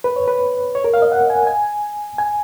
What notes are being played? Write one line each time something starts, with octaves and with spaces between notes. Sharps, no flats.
B4
C#5
B4
C#5
A#4
F5
D#5
F#5
G#5
G#5
G#5